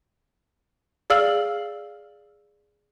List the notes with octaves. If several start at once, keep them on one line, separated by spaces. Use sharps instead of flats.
G#4 D5 F5 E6 F6 F#7